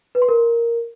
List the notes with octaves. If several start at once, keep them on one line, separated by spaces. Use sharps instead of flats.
B4
C6
A#4